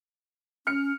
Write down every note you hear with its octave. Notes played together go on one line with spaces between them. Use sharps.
C#4 F6 C#7